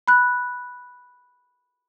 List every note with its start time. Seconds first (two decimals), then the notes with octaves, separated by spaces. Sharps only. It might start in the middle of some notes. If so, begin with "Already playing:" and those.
0.08 B5 F#6